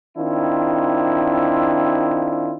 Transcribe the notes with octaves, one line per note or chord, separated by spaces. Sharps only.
D#3 C4 D4 E4 F4